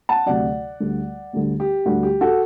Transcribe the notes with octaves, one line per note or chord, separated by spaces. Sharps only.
F#5 A5
D2 C3 F#3 D5 F#5
D2 D3 G3
D2 D3 G3
G4
D2 D3 G3 F#4
G4
F#4 A4